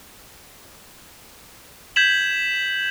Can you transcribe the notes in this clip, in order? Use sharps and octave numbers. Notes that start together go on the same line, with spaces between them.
G6 G#6 B6 E7 F#7